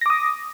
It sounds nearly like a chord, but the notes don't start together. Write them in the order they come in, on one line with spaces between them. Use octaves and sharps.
A#6 D6 D#6